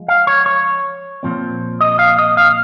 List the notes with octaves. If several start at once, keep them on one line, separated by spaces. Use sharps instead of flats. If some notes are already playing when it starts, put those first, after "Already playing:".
Already playing: F3 G#3
F5
C#5
C#5
A#2 F3 C4
D#5
F5
D#5
F5